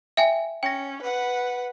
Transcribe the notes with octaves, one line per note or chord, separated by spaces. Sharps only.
E5 G5 G#5
C#4 G5 A#6
B4 F#5